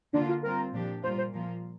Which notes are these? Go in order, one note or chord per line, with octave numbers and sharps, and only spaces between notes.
D3 A#3 D4 F4
F4
G3 C4 F4 A#4
A#2 F3 D4 G4
A#2 G3 A#3 F4 C5
C5
A#2 F3 A#3 F4